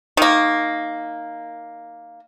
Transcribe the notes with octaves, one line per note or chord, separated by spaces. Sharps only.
D#3 A#3